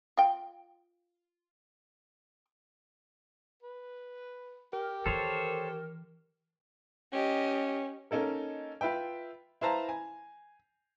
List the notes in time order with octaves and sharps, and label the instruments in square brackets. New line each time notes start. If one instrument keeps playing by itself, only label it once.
[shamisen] F4 G5
[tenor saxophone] B4
[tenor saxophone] G4 [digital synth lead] A#4
[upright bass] D#3 E3 [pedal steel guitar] A4 C5 C#5
[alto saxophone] C#4 [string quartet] G4 D#5
[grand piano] A#3 C#4 D#4 A4 A#4
F4 B4 E5 G5
E4 B4 C5 F5 A5 A#5
G#5